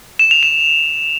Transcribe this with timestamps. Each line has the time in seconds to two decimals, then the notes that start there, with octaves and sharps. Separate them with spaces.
0.19 E7
0.31 F7
0.43 E7